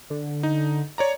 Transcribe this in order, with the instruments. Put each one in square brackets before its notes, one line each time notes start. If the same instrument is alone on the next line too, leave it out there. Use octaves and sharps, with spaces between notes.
[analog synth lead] D3
[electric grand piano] D#4
C#5 D5 A#5